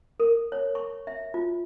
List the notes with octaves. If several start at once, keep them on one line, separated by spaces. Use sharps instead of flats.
A#4
C#5
C#6
E5
F4